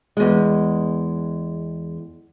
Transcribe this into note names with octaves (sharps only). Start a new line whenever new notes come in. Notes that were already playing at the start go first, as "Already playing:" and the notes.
E2 G#3